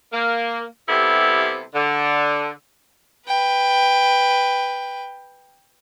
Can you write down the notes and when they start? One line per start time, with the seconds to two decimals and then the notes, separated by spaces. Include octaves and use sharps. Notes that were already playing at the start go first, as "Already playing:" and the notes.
0.13 A#3
0.89 C3 G3 B3 E4 A4
1.74 D3
3.27 B4 G5